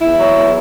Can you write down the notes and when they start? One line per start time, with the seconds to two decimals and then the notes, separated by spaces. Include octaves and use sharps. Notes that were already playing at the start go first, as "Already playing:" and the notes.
0.02 E2 E4
0.19 F#3
0.35 E2